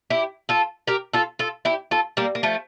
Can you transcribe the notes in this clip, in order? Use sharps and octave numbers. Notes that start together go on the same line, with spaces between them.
E4 G4
F4 A4
G4 A#4
F4 A4
F4 A4
E4 G4
F4 A4
G3 A#3
A#3
F3 A3